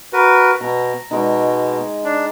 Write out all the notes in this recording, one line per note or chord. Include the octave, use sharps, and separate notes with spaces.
F#4 A#4 B4
B2 A#5
B2 G#3 D#4
D4